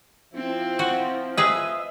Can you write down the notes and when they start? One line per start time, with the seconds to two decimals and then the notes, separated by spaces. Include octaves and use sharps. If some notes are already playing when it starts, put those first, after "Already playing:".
0.33 F3 C4 E4
0.79 F#4
1.38 G#4 B4 D#5 E5